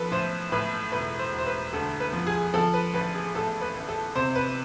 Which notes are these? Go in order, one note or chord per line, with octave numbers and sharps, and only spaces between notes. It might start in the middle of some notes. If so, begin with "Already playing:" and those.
Already playing: B1 F3 A4 B4
A2 C5
A2 B4
E1 B4
C5
E1
C5
B4
D2 A4
B4
F3
G#4
F3 A4
B4
A1 B4
G#4
A2 A4
B4
A1
A4
C3 C5
B4